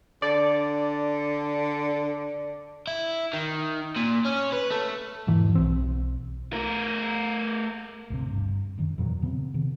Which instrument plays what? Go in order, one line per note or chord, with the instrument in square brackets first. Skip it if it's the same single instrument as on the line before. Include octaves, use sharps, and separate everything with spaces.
[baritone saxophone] D3 [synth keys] D5
[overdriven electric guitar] E4
D#3
A#2
C#4
B4
A3
[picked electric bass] E1 G#2 E3
B1 C4
[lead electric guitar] A3 A#4
[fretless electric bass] G#1 D2 C3
G2
E1 F#2 D#3
E2 A#2 F#3
C#3 B3 C4
C3 D#3